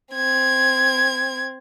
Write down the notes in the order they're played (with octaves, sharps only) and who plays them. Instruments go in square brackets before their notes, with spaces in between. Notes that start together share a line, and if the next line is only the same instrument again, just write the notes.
[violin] C4 G#6